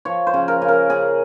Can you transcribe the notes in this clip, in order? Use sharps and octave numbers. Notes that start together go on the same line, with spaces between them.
F3 C#5
C5
C#3
A#4
C#3
A#4
C#3 G#4